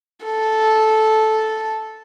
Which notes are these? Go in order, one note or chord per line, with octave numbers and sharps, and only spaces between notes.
A4